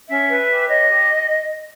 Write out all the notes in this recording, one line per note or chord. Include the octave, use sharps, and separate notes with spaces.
C#4 E5
B4
G4
C#5 D#5
G4